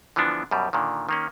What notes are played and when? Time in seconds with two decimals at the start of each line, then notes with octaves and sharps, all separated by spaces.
0.16 D3 E3 F3 B3 D4
0.51 F#2 B2 G3
0.73 A#2 D3 D#3
1.09 D#3 A#3 C#4